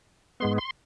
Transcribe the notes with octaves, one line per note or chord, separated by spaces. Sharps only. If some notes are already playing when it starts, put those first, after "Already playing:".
G#2 G#3 B3 C6
C6